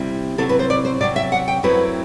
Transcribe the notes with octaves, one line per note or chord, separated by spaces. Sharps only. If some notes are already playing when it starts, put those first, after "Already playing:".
Already playing: C3 G3 C4 E4
C3 F#3 C4 E4 A4
B4
C5
D5
C5
C3 F#3 C4 D5
E5
F#5
G5
F#2 F#3 A3 C4 E4 B4